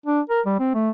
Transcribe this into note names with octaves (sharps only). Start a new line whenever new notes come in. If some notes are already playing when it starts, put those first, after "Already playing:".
D4
A#4
G3
C4
A3